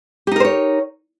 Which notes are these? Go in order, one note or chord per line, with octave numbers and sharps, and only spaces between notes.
D#4 G4 A#4 C5 C#5